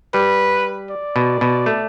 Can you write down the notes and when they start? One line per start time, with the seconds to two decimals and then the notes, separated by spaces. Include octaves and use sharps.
0.14 G3 B4
0.90 D5
1.16 B2
1.41 B2
1.66 A3